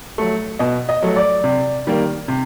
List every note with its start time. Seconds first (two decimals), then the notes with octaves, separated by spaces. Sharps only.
0.18 F#3 A3
0.59 B2 D#5
0.89 D#5
1.02 F#3 A3
1.16 D5
1.44 C3
1.87 D#3 G3 A#3
2.28 C3